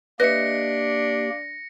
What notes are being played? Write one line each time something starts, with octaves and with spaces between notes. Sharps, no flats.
A#3 D4 G4 B4 D#5 E5 A#6 C#7